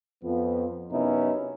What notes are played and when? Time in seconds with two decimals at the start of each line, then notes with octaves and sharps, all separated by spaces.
0.24 F2 F3 B3
0.91 F#2 C3 B3 C#4 D#4 E4